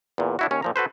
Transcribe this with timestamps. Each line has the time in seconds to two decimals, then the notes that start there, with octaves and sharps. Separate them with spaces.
0.18 E2 A#2
0.39 D4 E4 F#4
0.51 D#2 C#4 C#5
0.62 A#2 F3 A#5
0.76 F#4 A4 B4 C5